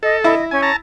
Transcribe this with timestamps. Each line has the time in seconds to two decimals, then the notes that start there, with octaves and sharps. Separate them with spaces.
0.03 A4 D#5
0.24 E4 D#5
0.51 C#4 G#5
0.62 A5 A#5